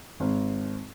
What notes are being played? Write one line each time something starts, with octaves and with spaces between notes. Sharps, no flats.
G#1